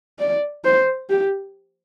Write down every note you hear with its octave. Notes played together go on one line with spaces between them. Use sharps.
D5
C5
G4